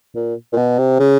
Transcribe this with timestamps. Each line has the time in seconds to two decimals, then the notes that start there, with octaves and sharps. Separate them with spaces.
0.15 A#2
0.53 A#2
0.57 B2
0.78 C3
0.99 C#3